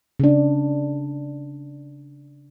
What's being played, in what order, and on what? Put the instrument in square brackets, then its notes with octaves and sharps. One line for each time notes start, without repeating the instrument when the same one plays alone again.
[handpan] C#3 D4